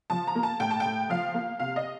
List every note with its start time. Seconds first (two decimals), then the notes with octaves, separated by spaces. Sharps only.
0.10 F3 A5
0.27 A#5
0.35 A#3
0.43 A5
0.60 A2 G5
0.71 A5
0.80 A2 G5
1.10 F3 F5
1.34 A#3
1.59 C3 F5
1.76 D#5